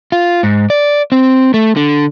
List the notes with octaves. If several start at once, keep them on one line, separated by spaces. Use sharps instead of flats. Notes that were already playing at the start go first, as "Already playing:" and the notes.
F4
G#2
D5
C4
A3
D3